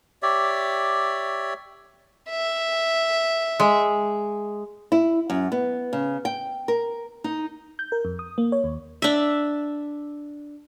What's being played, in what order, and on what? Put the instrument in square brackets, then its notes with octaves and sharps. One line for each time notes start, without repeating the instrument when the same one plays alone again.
[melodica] G4 C#5 D5 E5
[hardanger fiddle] E5
[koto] G#3
[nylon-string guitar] E4
F#2
B3
C#3
G5
A#4
D#4
[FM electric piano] G6
A#4
F2
D#6
A#3
C#5
D#2
[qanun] D4 E5